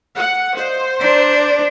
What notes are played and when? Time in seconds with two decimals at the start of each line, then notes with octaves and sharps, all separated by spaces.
0.16 F#5
0.58 F4 C5 D#5
1.00 D4 E4 A#4 D5